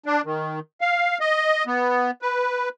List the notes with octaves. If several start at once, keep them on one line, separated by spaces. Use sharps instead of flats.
D4
D#3
F5
D#5
B3
B4